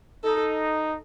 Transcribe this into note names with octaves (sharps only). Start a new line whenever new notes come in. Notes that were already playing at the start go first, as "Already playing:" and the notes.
D#4 A4